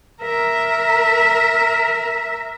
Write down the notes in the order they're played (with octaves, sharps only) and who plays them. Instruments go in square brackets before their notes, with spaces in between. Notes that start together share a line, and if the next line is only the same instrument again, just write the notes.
[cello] A#4 E5